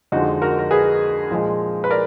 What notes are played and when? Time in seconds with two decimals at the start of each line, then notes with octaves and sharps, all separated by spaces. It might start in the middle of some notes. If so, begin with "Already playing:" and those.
0.12 F2 D3 F3 G#3 D#4 F#4
0.42 F#4 A#4
0.59 A#4
0.71 G#4 B4
1.31 A#2 F3 G#3
1.84 B4
1.90 A#4 D5